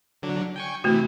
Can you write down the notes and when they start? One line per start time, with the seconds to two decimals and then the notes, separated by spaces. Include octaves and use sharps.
0.22 D3 F#3 D4
0.56 G5 G#5 C#6
0.84 C3 E3 A3 E4 F#4